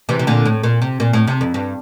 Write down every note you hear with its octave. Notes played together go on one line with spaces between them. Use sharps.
C3 E3
C3
A#2 D3
A2
A#2
C3
A#2
A2
C3
F2
G2